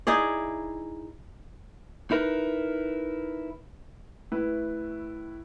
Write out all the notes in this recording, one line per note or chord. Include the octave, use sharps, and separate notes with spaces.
D#4 E4 G#4 D5
D#4 E4 A#4 B4
A2 E4 B4